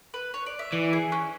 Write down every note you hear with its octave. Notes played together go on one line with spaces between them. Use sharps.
B4
C#5
D5
E5
E3 D5
G#4
C#4